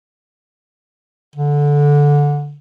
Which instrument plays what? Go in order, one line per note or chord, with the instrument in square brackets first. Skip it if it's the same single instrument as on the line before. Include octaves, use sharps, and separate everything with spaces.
[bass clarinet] D3